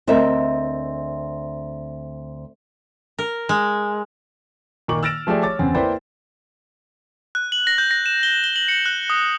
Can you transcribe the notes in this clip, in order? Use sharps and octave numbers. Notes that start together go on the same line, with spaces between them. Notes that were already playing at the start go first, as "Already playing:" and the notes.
D2 C4 A#4 D#5 E5
A#4
G#3
A#2 D#3 A#3 C#6 D6 F#7
E6 F6 A6 A#6 D7 E7
F3 A3 G4 G#4 D5
C#5 D6 A6
E2 C#3 C4 G#5
A#3 E4 B4 C5 D5 G5
F#6
F#7
A#6
G6
A#6
E7
G7
G7
F#7
C#7
F#6
D#6